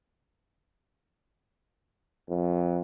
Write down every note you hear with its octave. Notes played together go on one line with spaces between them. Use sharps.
F2